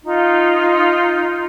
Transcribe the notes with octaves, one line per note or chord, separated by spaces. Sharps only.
D#4 F4